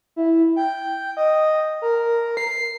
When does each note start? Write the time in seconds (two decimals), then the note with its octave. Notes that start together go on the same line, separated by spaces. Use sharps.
0.16 E4
0.56 G5
1.17 D#5
1.82 A#4
2.37 C7